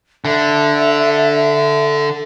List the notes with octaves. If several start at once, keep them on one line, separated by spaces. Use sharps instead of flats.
D3 E5